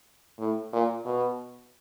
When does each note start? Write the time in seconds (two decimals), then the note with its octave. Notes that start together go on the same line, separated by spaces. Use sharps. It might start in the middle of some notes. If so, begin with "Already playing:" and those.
0.39 A2
0.73 A#2
1.05 B2